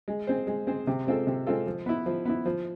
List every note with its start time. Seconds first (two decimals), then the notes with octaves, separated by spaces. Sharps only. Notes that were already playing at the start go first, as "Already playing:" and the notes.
0.08 G#3
0.27 C4 G#4 C5
0.47 G#3
0.67 C4 G#4 C5
0.87 C3
1.07 G#3 C4 F4 A4
1.27 C3
1.47 G#3 C4 F4 A4
1.67 F3
1.86 B3 E4
2.06 F3
2.25 B3 E4
2.46 F3